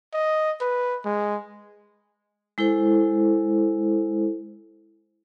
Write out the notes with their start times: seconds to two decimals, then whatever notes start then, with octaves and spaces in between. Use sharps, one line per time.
0.14 D#5
0.61 B4
1.05 G#3
2.58 G#3 E4 A4 C5